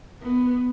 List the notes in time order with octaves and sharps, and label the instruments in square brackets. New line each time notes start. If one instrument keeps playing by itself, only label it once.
[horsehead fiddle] B3